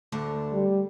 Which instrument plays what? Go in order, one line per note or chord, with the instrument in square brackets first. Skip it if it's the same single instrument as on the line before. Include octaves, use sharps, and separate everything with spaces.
[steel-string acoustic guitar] D2 D3 A5
[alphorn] G3